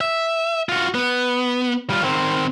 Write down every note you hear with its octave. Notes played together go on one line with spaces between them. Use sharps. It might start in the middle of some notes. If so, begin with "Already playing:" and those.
E5
F4 F#4
B3
G3 F4
D#3 C4